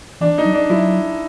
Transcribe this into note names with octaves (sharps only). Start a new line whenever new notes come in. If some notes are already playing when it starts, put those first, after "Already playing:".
E3 D4
D#4
F#3
D4
F#3 E4